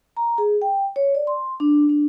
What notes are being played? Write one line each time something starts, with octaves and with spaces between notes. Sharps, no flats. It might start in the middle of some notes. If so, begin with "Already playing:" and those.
A#5
G#4
G5
C#5
D5
C6
D4
D4